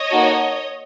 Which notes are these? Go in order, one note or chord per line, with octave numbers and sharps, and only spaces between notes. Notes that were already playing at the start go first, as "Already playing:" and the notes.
Already playing: C#5 D#5
A#3 D#4 F#4 A4